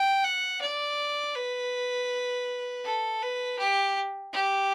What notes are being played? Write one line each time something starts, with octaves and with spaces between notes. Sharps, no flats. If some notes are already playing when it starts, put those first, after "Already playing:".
Already playing: G5
F#5
D5
B4
A4
B4
G4
G4